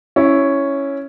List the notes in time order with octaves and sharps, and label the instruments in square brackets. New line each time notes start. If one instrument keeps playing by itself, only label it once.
[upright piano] C#4 E4